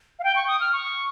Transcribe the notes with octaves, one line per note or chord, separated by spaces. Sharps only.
F5
G5
C#6
D#6
F6
C#6